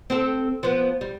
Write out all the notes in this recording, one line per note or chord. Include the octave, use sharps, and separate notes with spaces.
C4 G4 A4
F3 B3
G3